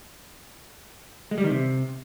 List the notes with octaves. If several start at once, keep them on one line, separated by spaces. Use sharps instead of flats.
G#3
G3
D#3
C3